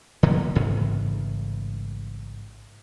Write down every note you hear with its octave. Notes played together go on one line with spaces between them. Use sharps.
D3 F3 A#3 B3
A1 G#2 C#3